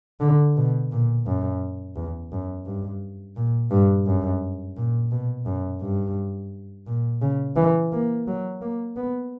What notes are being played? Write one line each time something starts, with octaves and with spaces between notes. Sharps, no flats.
D3
B2
A#2
F#2
E2
F#2
G2
A#2
G2
F#2
A#2
B2
F#2
G2
A#2
C#3
E3
A#3
F#3
A#3
B3